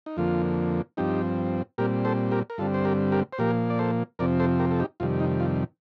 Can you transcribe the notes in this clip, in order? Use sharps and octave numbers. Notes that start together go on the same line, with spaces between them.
D#4
F2 D3 F3 A#3 F4
G2 F3 C4 D#4 G4
A#2 G3 C4 G4 A#4
A4 C5
G4 A#4
A#4
G2 D3 G3 C4 F4 A4
C5
G4 A#4
G4 A#4
C5
A#2 F3 A#3 G4 A#4
D5
A4 C5
F2 C3 F3 C4 A#4 D5
A4 C5
G4 A#4
A4
D#4 G4
F2 C3 D#3 G3 F4
D#4
F4